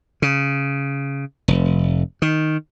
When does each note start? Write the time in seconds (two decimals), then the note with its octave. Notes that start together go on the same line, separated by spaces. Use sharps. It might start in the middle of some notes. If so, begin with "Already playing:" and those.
0.22 C#3
1.48 F1
2.22 D#3